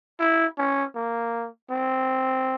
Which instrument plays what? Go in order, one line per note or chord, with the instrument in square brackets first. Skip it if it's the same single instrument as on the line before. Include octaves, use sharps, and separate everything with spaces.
[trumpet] E4
C#4
A#3
C4